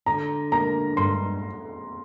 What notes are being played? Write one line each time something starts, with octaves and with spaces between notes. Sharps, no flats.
D3 A#5
A#3 A#5
G2 C6